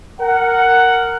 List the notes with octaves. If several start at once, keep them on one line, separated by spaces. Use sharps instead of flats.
A#4 F#5